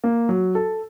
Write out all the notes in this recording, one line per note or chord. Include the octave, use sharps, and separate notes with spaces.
A#3
F#3
A4